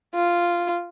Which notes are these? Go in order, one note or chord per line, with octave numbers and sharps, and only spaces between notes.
F4